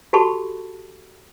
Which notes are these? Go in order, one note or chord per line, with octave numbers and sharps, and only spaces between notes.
F#4 G4 A4 A5 B5 C#6